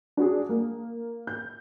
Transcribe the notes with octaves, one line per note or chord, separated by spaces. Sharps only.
D4 F#4 G#4
A#3
G6